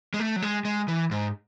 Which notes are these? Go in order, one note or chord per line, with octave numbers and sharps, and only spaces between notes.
G#3
A3
F#3
G#3
G#3
E3
G#2